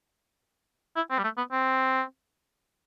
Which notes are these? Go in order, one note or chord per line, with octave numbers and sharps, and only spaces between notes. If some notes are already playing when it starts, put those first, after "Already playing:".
E4
C4
G3
A3
B3
C4